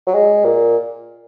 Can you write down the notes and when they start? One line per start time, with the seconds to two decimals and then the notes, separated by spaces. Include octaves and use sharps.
0.07 F#3
0.14 G#3
0.45 A#2